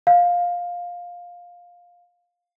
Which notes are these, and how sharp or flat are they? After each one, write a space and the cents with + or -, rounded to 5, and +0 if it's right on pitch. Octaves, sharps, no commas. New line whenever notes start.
F5 +10